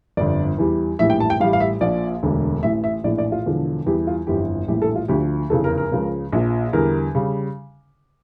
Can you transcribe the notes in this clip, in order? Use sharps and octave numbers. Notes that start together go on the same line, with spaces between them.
G1 F2 D3 D5
E2 E3 G3
A#1 A2 E3 G3 E5
G5
A5
G5
A1 A2 E3 G3 F5
F5
E5
A#1 A#2 F3 D5
E1 D2 D3
A1 A2 E3 E5
E5
A#1 A2 E3 D5
D5
F4
E1 E2 D3 F3
E2 E3 G3 G4
F4
G1 F2 E3 G4
A#1 A2 E3 G3 G4
A4
F4
D2 D3 F3 G4
F1 E2 C#3 A4
A#4
A#4
C#2 C#3 F3
A#1 A#2 F3
E2 D3 G3 A#4
C#3 G3